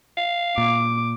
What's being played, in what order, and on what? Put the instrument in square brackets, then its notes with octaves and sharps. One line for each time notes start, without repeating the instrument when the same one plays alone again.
[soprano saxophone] F5
[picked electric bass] A#2 [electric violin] D6